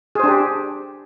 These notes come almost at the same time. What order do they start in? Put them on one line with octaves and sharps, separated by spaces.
G#4 C5 D4 G4